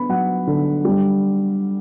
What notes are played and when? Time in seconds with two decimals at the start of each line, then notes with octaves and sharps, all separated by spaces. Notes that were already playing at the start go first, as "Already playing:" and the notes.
Already playing: D3 B3 B5
0.09 F#3 F#5
0.47 D3
0.85 G3